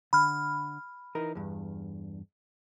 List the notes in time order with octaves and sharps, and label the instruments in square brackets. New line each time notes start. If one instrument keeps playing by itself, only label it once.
[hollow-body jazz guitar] D3 [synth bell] B5 F6
[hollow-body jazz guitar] E3 D#4 A#4
E2 G2